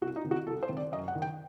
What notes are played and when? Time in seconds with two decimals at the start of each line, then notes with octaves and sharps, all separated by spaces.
0.01 C2 F#4
0.16 D#4
0.24 C3 D#3
0.31 F#4
0.47 C2 A4
0.63 C5
0.69 C3 D#3
0.77 D5
0.92 F#2 D#5
1.08 F#5
1.15 D#3
1.22 G5